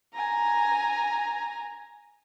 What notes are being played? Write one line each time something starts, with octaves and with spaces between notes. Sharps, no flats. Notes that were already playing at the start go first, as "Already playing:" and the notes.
G#5 A#5